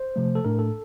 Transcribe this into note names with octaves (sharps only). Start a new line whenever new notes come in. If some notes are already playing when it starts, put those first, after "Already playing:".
Already playing: C5
C3 F3 A3
A4
A2 A3 D4 A#4
A4